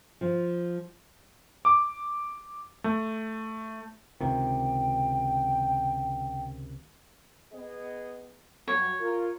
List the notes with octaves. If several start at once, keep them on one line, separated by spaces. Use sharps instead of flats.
F3
D6
A3
C#2 C3 D#3 G5
B3 G#4 D#5
G2 F#3 C#5
F4 A#4